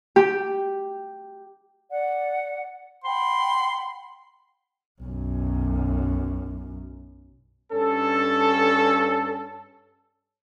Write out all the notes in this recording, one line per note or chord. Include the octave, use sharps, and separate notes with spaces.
G4
D5 F#5
F#5 G5 B5 C6
B1 F#2
G2 C#4 A4